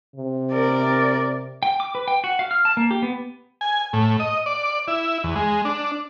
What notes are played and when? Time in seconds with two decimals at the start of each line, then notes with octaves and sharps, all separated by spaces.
0.16 C3
0.53 A#4 D5
1.63 G5
1.80 D6
1.95 B4
2.08 G5
2.24 F#4
2.39 F5
2.51 F6
2.65 A5
2.77 A#3
2.91 G4
3.02 B3
3.61 G#5
3.93 A2
4.20 D#5
4.46 D5
4.88 E4
5.24 E2
5.36 G#3
5.65 D4